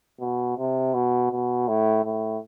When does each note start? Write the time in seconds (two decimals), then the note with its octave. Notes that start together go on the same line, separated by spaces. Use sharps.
0.20 B2
0.58 C3
0.94 B2
1.31 B2
1.68 A2
2.04 A2